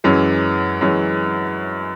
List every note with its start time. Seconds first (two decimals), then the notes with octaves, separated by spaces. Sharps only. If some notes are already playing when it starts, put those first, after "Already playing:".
0.04 F#2 E3 G#3 C#4
0.81 F#2 E3 G#3 C#4